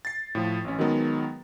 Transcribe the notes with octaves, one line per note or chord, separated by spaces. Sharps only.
A6 C7
A2 F3
A1 C#4
D#3 F#3 G#3 B3